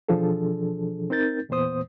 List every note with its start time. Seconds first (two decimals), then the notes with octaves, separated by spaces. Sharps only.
0.09 B2 E3 F3 D4 G#4 A4
1.10 C4 D#4 A#4 G6 A6
1.49 E2 A#2 E3 B3 C5 D#6